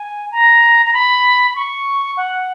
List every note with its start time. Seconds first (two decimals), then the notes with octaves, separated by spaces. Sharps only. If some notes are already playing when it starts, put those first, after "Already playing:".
Already playing: G#5
0.32 A#5
0.86 A#5
0.93 B5
1.51 B5
1.56 C#6
2.17 F#5